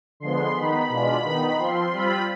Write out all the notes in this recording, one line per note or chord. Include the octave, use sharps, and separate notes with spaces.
D3 F3 G#3 B3 C6
D#3 B3 D#4 B5
B2 G#3 D4 F4
D#3 B3 D#4
F3 C4 F4 C6
G3 C4 F4 B5